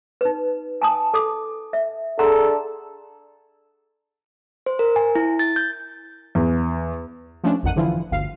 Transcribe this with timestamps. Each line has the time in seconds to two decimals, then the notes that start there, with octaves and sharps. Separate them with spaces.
0.21 D#4 B4
0.82 G#5 A5 D#6
1.14 A4 D6 D#6
1.73 E5
2.19 D4 G#4 A4 F#5 A#5 C6
4.66 C5
4.79 A#4
4.96 G#5
5.15 E4
5.39 A6
5.56 G6
6.35 E2
7.44 F3 A3 C#4 D4
7.63 A1 F2 D#3 F#5 D#7
7.76 G2 D3 E3 F3 E4 F4
8.11 G1 D2 F5 C7